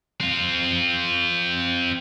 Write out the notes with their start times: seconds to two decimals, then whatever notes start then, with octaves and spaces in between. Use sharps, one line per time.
0.20 C4 F4